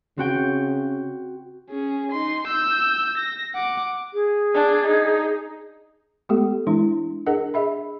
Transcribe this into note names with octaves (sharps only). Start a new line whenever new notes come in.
C#3 C4 F#4 G5
C#4 G#4
D#4 C6
E6 G6
A#6
F#5 D6
G#4
D4
D#4
G#3 A3 B3 G4 A4
E3 G#3 D4 E4
D4 G#4 A#4 D#5 F#5
G#4 D#5 E5 B5